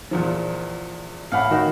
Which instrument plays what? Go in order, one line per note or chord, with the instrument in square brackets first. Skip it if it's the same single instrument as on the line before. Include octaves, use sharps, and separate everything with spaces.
[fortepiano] E2 A#2 F3
[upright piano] A1 F#5 B5 [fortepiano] F5
[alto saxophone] D#3 [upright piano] F#4